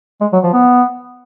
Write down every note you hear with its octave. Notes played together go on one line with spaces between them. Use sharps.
G#3
F#3
F3
B3